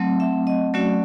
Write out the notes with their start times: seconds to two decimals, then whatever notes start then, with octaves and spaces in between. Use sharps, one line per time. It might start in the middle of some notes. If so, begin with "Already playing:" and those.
Already playing: F#3 A3 C4
0.20 E5
0.47 D#5
0.74 F#3 A3 C#4 F#4 D5